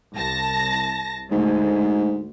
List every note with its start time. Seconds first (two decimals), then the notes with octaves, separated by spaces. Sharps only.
0.15 C2 A5 A#6
1.32 D2 G#2